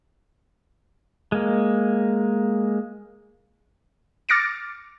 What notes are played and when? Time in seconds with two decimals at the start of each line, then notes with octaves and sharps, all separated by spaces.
1.32 G#3 A#3
4.29 D6 F6 A6 A#6 C#7 D7